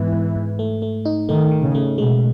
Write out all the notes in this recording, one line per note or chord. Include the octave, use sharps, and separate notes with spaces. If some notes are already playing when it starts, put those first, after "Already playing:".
Already playing: G#2 E3 G#3 B3
G#2
G#2
A3
A3
D#4
D#3 A3
D#3
C#3
A3
B2 G#3